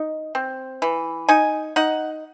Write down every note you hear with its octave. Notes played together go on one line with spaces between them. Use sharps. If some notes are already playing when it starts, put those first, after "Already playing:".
Already playing: D#4
C4
E3
D#4 G#5
D#4 F#5